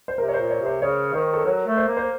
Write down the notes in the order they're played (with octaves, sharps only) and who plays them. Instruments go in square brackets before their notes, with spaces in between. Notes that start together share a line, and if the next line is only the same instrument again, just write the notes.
[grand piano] C5
[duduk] C3 [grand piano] A#4
[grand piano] C#5
C5
[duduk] A#2
[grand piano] C#5
[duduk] C3
[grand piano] C5
[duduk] C#3 [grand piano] C#5
[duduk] D#3 [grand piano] C5
[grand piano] A4
[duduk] F#3 [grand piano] A#4
[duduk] A3
[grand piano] C5
[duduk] A#3
[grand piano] C5